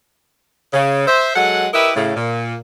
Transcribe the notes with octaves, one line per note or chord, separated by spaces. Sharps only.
C#3
C5 E5
F#3 G#3 A4 F#5
E4 G4 A#4 B4 D#5 E5
A2 C#3
A#2